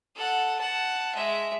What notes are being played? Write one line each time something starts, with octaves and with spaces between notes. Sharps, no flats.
A4 F#5
F#5 A5
G#3 E5